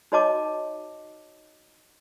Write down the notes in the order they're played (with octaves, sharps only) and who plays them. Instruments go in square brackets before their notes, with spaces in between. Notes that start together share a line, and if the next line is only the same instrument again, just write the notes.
[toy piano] D#4 F#4 C#5 D#5 A5 D6